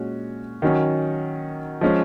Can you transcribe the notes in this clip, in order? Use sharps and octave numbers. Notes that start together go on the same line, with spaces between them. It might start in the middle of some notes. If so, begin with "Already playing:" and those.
Already playing: A#2 G#3 C#4 F#4
D#3 F#3 C#4
F3 G#3 C#4